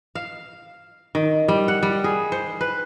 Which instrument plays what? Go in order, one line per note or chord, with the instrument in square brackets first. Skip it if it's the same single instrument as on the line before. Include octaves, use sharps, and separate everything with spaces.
[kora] F5
D#3
G3
F#5
G3
G#4
C5
B4